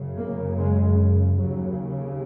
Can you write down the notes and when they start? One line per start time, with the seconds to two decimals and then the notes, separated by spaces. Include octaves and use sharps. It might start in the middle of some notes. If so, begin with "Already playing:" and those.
Already playing: F#2 C#3
0.17 A#3
0.57 G#3
1.37 D#2 C#3 F#3